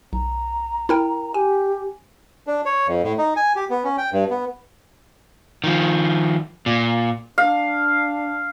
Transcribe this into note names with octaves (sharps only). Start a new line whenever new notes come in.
B1 A#5
E4 A#4 G5
G4 G#5
D4
C#5
F2
A2
D#4
G#5
G4
B3
C#4
G5
G2
B3
D#3 F3
A#2
D4 F5